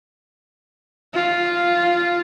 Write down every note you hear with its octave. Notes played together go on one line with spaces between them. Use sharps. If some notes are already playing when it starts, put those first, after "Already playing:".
F4